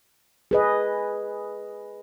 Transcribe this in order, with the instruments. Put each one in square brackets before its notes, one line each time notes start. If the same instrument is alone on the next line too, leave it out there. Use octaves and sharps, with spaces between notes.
[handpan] G#4 B4 D#5